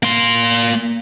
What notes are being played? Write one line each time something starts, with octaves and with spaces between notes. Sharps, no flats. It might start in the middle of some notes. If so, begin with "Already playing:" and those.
A#3 C6